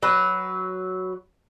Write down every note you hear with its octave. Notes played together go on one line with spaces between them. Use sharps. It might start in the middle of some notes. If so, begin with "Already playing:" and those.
F#3 B4